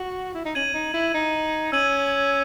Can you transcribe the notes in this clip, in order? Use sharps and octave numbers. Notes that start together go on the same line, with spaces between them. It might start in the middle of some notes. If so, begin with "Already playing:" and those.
Already playing: F#4
E4
D#4
C#4 G#6 D#7 F#7
D#4
E4
D#4
C#4 E6 G#6 D#7 F#7